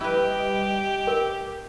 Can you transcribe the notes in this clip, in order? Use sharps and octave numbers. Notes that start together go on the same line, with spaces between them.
G3 E4 G4 B4 D#5 D7
A#4